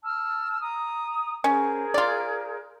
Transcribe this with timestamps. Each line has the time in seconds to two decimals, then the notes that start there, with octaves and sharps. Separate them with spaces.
0.02 A5 E6 F6
0.62 A#5 D#6
1.44 C#4 G#4 A#4 C5
1.94 F4 D5